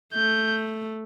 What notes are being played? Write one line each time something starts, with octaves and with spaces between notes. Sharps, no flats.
A3 G6